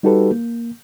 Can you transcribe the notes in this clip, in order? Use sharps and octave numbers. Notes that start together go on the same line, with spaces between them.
G3 D#4 F#4 G4 A4 B4
A#3